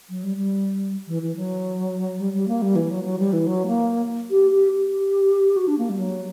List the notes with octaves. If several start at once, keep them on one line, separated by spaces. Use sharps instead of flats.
F#3
G3
G3
E3
E3
F#3
G3
G3
A#3
G3
E3
F#3
F#3
G3
E3
F#3
A#3
G4
G4
G4
F#4
D4
A#3
G3
F#3